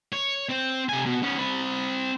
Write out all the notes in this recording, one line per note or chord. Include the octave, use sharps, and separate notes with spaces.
C#5
C4
C3 G#5
B2
B3 C#4
C4 B5